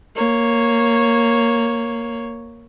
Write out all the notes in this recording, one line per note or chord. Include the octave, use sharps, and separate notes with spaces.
A#3 C#5